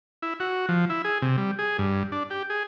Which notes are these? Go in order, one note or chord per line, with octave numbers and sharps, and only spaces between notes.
E4
F#4
F3
E4
G#4
C3
G3
G#4
G2
D4
G4
G#4